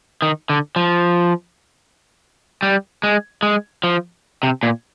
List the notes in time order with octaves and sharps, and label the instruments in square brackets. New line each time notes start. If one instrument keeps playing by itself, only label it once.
[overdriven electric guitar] D#3
D3
F3
G3
G#3
G#3
F3
C3
A#2